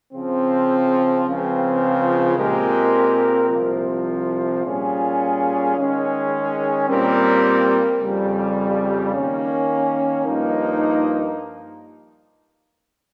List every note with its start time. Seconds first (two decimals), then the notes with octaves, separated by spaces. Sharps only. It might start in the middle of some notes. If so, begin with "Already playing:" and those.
0.13 C#3 F3 C4
1.26 C#2 C#3 F3 C4
2.38 A#2 G#3 C4 G4 A#4
3.50 C2 C3 F3
4.64 A#2 G3 C#4 F4 G#4
5.75 D#3 G#3 C#4 G#4
6.88 A#2 G3 C4 G4 A#4
8.00 F2 C#3 G3
9.14 D#3 A#3 C#4
10.26 G2 F3 A#3 D#4